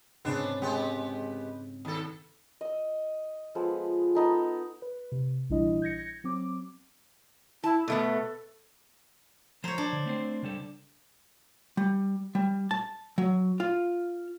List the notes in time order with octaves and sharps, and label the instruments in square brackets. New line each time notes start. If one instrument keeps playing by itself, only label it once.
[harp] G#2 C#3 C4 [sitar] B3 D4
[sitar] G#3 B3 G4
[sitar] D#2 A4 [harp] D#6 A6
[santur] D#5 E6
F3 G#3 B3 A4
B3 D#4 A4
[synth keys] B4
C3
A#1 E3 G3 D4 E4 D#5
G6 G#6 A#6 C#7
F#3 C4 D6
[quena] E4 [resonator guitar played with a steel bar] A5
[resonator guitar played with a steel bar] B2 A3 B3 [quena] A4
[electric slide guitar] F3 A#5 [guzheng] C5 C#5
[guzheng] D4
[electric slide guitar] D3
A3 C4 C5
C#3 G3 A4
[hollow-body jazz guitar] G3
G3
A5
F#3
F4